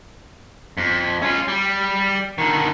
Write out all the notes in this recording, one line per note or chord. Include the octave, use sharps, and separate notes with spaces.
F2
C#4 F4
G3
D3 D#3